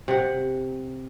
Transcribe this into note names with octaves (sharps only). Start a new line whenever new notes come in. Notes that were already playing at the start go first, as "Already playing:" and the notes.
C3 F#5